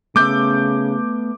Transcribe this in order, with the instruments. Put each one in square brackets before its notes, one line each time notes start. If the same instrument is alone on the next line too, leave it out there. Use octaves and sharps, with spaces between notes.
[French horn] C#3 [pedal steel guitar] A3 B3 E6 [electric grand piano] D6 G6